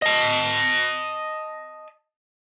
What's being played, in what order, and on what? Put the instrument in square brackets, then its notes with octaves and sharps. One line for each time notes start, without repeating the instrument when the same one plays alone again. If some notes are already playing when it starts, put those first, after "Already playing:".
[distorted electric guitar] D#5 A5